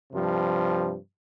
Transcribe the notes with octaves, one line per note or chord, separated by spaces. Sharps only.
G2 C3 F3